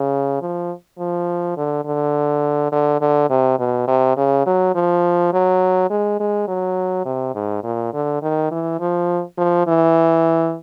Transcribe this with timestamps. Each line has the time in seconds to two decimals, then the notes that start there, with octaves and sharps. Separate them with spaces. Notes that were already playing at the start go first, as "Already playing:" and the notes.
Already playing: C#3
0.41 F3
0.98 F3
1.57 D3
1.85 D3
2.72 D3
3.01 D3
3.30 C3
3.59 B2
3.87 C3
4.17 C#3
4.46 F#3
4.75 F3
5.33 F#3
5.90 G#3
6.20 G#3
6.48 F#3
7.05 C3
7.35 G#2
7.63 A#2
7.93 D3
8.22 D#3
8.51 E3
8.80 F3
9.38 F3
9.67 E3